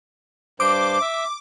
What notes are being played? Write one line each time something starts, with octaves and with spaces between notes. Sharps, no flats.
G2 C5 D6
E5